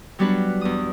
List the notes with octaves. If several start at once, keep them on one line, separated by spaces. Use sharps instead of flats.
F#3 G3 B3 D4 F#4 B4
E2 D#6